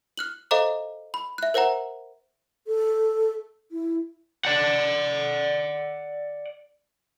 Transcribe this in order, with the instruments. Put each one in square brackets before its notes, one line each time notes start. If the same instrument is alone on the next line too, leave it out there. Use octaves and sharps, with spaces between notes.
[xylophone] F6 F#6 F#7
A4 C5 D#5 F5 A#5 D6
B5
E5 F#6
A#4 C5 E5 F#5 A#5
[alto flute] A4
E4
[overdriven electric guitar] D5 F#5